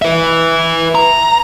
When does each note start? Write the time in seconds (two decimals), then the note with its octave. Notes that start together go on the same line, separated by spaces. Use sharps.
0.02 B4 E5
0.95 A#5